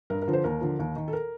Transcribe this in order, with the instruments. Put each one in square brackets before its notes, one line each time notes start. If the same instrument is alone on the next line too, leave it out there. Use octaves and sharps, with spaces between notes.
[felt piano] G2 A#4
A#4
D3 F3
C5
D#2 A#4
D3 F3
D#2
D#3
A4
A#4